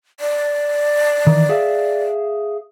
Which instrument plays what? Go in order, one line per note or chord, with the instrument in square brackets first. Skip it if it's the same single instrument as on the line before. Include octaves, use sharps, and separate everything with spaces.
[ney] D5
[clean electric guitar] D#3 E3
G#4 E5 F5